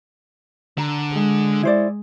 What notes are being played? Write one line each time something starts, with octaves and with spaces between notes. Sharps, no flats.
D3 A#5
G#3
E4 C5 D5